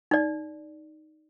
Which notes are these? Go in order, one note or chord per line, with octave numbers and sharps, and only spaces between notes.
D#4 D5